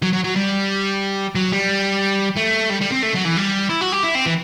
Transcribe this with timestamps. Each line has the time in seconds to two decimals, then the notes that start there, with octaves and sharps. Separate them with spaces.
0.02 F#3
0.13 F#3
0.24 F#3
0.36 G3
1.35 F#3
1.52 G3
2.36 A3
2.70 G3
2.81 G3
2.91 C4
3.02 A3
3.14 F#3
3.25 E3
3.36 G3
3.69 E4
3.81 F#4
3.92 G4
4.03 E4
4.15 C4
4.26 E3